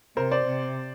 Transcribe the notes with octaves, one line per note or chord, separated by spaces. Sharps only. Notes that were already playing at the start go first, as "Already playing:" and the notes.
C3 A#4 C5
C5 D5
C3